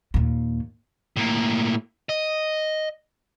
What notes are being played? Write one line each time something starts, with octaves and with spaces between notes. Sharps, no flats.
D#2 A#2
A2 A#3
D#5